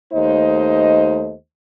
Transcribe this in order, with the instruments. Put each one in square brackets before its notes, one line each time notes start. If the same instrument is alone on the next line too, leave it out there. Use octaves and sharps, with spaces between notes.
[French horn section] D#2 A3 D#4 C5 D#5